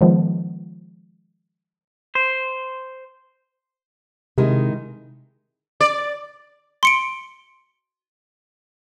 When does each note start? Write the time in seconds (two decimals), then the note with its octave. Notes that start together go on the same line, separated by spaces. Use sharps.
0.01 D#3 F3 G#3 B3
2.15 C5
4.38 C3 D#3 G#3 E4
5.81 D5
6.83 C6 C#7 D7